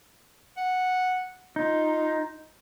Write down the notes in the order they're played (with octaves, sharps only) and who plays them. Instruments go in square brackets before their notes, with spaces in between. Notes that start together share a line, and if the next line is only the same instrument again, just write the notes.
[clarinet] F#5
[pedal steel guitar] D#4 [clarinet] F4